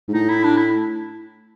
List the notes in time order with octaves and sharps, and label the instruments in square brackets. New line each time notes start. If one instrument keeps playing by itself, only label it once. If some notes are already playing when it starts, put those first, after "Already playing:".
[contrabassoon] G#2
[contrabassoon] A2 [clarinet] D#4
[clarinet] E4
D4
E4